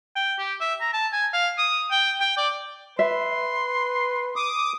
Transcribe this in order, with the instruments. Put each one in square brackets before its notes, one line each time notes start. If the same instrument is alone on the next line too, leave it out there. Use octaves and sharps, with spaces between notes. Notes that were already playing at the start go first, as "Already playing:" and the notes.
[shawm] G5
G4
E5
A#5
A5
G#5
F5
D#6
G5
G5
D5
[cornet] B4 [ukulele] E5 [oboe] C6
[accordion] D6 D#6